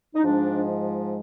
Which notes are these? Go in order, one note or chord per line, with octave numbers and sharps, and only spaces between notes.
D#4
G#2 F3 G#3 D4